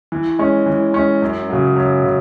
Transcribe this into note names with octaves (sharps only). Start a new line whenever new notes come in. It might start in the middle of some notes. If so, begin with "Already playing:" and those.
E3
G#3 C#4
E3
G#3 C#4
F#2
C#3 F#3
F#2
C#3